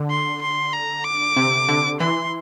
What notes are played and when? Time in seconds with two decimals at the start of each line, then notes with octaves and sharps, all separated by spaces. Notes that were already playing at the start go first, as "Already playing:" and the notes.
Already playing: D3
0.10 C6
0.42 C6
0.73 A#5
1.04 D6
1.36 C3
1.69 D3
2.00 E3 C6